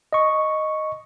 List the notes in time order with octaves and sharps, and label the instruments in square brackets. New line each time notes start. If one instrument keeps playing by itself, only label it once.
[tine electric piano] D#5 C#6